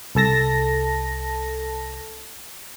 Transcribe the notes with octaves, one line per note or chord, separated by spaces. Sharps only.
C2 A4 A5 A#6